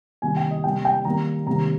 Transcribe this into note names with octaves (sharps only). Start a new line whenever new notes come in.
C3 D#3 G3 A#3 G#5
G5
D#5
C3 G3 A#3 G5
G5
D#3 G3 A#3 A#5
C3 D#3 G3 A#3 A#5